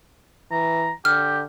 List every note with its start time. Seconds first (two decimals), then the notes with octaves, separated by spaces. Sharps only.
0.51 E3 A#5
1.05 D3 G4 F6